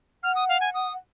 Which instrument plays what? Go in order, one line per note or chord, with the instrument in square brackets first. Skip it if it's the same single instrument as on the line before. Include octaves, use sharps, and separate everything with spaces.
[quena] F#5 [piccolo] F6
[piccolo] D#6
F5
G#5
D#6